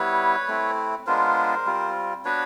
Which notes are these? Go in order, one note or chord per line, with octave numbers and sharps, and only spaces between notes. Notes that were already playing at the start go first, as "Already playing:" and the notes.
Already playing: G3 B3 E4 B4 C#5
A3 C4 E4
G#3 B3 D4 F4 A#4 C5
G3 C4 F4
B3 D4 F#4 B4 C#5